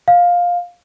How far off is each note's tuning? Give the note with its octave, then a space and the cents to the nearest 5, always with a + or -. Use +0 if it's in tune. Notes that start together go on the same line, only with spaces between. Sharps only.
F5 +15